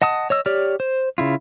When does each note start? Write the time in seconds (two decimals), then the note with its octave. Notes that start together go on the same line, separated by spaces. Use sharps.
0.02 D#5 F#5 A5 D#6
0.30 C#5 D#5 E6
0.46 G4 C#5 D5 F6
0.80 C5
1.18 C#3 E4 F4